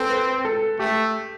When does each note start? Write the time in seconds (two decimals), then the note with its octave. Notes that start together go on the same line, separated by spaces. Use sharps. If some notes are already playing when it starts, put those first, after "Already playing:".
Already playing: C4 A4 B4
0.11 B4
0.45 A4
0.79 A3 G4